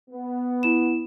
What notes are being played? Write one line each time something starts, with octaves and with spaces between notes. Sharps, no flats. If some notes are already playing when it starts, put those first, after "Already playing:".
B3
E4 E7